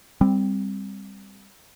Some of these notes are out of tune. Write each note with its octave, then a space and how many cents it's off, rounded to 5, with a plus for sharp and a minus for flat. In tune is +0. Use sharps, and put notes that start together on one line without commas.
G3 +15 C4 +0